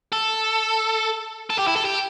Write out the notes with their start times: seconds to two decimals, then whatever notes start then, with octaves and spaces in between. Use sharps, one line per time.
0.12 A4
1.50 A4
1.59 G4
1.67 E4
1.76 A4
1.85 G4